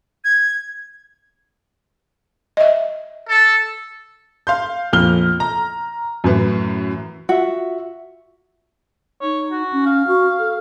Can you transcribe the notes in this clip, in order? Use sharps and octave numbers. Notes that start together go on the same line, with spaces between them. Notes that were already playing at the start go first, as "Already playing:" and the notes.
G#6
D#5 E5
A4
F5 C6 G6
A#1 F2 F6 G7
A#5
F#2 A2 E3
F4 F#4 E5
D#4 C#5
F#4
C#4
F5
F#4
A4